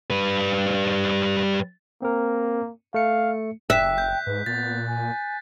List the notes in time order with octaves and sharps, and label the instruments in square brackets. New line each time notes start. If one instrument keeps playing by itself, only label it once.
[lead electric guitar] G3 B4
[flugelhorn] A#3 [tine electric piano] C4 A#4
[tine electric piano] A3 C#7 [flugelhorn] F5
[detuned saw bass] F#1 [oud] E5 [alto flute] G5 [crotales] F#6 B6
[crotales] G6
[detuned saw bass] G#2 [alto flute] B4
[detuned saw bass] A#2 [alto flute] B3 [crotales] A6
[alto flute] G#5